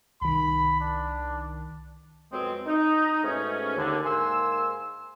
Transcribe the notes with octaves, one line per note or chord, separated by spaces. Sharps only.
C2 D#3 B5
D4
F2 B2 F#3 G#3 C4
D#4
G#2 B2 A3 C#4
D#2 D3
G#2 A#3 G#5 C6 E6